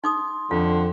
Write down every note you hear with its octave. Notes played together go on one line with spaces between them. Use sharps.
D#4 C6 D6 D#6
F2 D3 F4